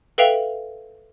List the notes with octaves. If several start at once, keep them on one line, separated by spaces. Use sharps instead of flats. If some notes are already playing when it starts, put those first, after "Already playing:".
A4 B4 E5 F5 G5 F7